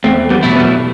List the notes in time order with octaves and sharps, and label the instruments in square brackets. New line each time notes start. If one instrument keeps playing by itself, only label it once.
[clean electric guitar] E2 [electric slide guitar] A3 C4
[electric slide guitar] G3 B3
[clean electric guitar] B2 F#3 A3 E4
[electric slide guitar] G3 B3